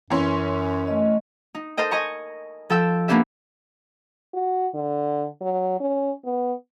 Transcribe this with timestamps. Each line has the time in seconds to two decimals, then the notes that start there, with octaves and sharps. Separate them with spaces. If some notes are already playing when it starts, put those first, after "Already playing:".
0.10 F#2 E3 C#4 C6
0.87 A3 D#5
1.55 D#4
1.77 A4 A#4 C5 D#5 G5
1.91 D#5 G#5 A#5 C#6
2.70 F3 A4 G5 E6
3.08 A#3 B3 C#4 D4 G4 E5
4.34 F#4
4.74 D3
5.41 F#3
5.80 C#4
6.25 B3